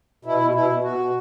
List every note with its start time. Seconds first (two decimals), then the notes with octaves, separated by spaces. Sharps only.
0.25 B2 E4
0.41 B2
0.54 B2 E4
0.70 B2
0.84 B2 F#4
0.98 B2